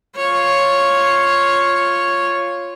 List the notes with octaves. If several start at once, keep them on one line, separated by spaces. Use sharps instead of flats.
F4 C#5